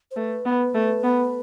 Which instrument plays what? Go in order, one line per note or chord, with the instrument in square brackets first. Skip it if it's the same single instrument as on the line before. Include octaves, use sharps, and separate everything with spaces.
[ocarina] C5
[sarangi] A3 [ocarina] B4
[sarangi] B3
A3
B3